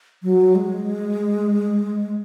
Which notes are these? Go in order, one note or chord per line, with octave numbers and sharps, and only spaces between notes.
F#3
G#3